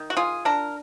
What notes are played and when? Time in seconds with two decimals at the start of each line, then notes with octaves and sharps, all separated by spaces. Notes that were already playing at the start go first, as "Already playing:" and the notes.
Already playing: D#3
0.10 F#4
0.17 F4 G#4
0.45 D4 A#4